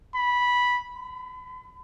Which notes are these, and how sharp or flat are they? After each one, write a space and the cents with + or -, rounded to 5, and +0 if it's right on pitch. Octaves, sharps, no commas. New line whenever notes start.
B5 -10
B5 +40